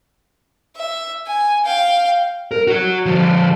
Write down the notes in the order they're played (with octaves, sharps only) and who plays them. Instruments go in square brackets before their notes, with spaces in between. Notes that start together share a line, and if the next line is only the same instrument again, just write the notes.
[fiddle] E5
G#5
F5 G5
[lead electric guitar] A#4
F#4 C#5
D3 F3